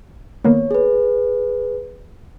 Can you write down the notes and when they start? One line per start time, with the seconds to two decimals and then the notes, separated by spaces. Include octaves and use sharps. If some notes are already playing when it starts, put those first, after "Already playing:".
0.44 D#3 A#3 B3 C#5
0.71 G#4 B4